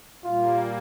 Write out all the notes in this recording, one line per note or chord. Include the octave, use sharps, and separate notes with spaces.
A#2 G3 A#3 F4